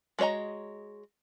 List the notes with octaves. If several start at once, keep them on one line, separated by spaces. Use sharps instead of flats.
G#3 F#4 C#5 D#5 A#5